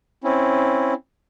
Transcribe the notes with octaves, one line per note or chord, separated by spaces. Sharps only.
C4 C#4 E4